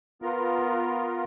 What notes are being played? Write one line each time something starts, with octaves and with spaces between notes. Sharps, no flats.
B3 F4 A#4